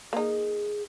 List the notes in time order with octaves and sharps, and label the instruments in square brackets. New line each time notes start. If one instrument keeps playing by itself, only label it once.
[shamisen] A#3 D#4 [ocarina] G#4